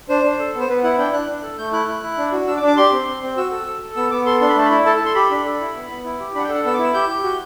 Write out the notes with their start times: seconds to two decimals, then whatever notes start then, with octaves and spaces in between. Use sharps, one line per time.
0.09 D4 C5
0.23 D4
0.39 A4
0.54 B3
0.60 C5
0.69 B3 B4
0.83 E4 F#5
0.98 D4 G5
1.13 D4 F#6
1.29 D4
1.43 A4
1.58 A3 G6
1.73 E4 F#6
1.88 E4
2.03 E4
2.18 D4
2.32 F#4
2.47 D4 E6
2.57 D6
2.63 D4
2.68 D6
2.77 G4 C6
2.92 C4
3.07 C4
3.22 C4
3.37 F#4 E6
3.51 A4
3.67 A4
3.82 A4
3.96 B3 E6
4.11 B3 D6
4.26 A4 C6
4.41 D4 C6
4.49 B5
4.55 A3 A5
4.65 B5
4.71 E4
4.86 A4 A5
4.96 A5
5.01 A4 C6
5.15 G4 B5
5.31 D4
5.46 A4
5.61 E4
5.76 B3
5.90 B3
6.04 E4
6.20 G4
6.35 D4 F#5 B5
6.44 G5
6.49 A4
6.54 F#5
6.65 B3 E6
6.74 D6
6.79 E4
6.84 E6
6.94 G4 G6
7.09 G4
7.24 F#4